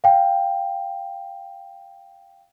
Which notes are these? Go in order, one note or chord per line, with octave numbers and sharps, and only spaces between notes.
F5 G5